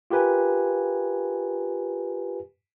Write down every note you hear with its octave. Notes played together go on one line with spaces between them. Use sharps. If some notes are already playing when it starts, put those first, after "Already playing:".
F4 G4 A#4 B4 G#5